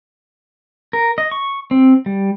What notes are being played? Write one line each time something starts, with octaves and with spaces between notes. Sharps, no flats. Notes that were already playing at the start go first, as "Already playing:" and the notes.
A#4
D#5
C#6
C4
G3